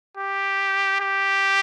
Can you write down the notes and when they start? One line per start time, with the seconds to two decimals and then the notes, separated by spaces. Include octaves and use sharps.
0.17 G4
1.00 G4